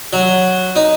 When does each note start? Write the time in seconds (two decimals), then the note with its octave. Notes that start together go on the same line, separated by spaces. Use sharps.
0.13 F#3
0.76 D#4